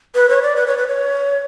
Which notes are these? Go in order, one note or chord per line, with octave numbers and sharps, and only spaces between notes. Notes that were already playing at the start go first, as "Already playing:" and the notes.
B4
C#5
D5
B4
C#5
B4
C#5